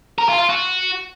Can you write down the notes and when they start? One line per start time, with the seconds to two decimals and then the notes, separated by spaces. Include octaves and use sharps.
0.18 A#4
0.29 F4
0.39 F4
0.49 F#4